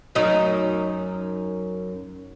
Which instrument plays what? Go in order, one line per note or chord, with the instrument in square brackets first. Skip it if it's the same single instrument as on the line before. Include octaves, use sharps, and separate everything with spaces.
[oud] F#2 D#4